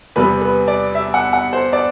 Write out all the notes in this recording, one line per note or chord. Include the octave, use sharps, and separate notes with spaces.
E2 C3 G3 B3 B4
B4
D5
E5
F#5
F#5
C5
D5